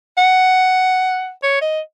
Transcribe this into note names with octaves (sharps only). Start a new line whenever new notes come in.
F#5
C#5
D#5